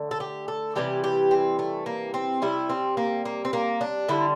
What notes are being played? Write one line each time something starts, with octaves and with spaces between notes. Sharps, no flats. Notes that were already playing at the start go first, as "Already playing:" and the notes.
Already playing: D3 A3
A4
G4
A4
C3 E3 G3 G4
G4
C4
A3
A#3
C4
C3 G3 E4
C4
A#3
A#3
C4
A#3
D4
D3 G3 E4